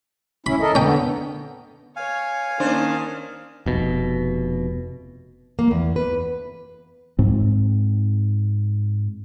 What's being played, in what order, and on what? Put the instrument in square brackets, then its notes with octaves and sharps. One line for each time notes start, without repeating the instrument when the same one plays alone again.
[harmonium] C#4 E4 [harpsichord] B5
[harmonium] A4 A#4 D#5
[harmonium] D3 B3 [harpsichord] C#4 G5
[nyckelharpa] C#5 [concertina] F5 G#5
[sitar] D#3 D4 C5 [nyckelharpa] A#3 C#4
[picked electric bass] F1 B2
[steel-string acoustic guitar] A#3
E2
B4
[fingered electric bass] G#2 C4